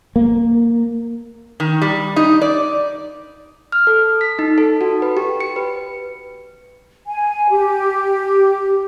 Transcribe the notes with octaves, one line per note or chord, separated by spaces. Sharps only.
A#3
D#3
G3
D#4
D5
F6
A4
B6
D#4
A4
F#4
B4
G4
C#7
B4
G#5
G4